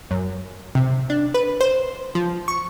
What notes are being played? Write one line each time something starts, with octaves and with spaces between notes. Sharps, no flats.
F#2
C3
D4
B4
C5
F3
C#6